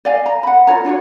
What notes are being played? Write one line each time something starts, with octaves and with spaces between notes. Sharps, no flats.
D5 D#5 F5 G#5
A#5
F#5 B5
F4 G#4 C#5 A#5
D4 F4 F#4 C#5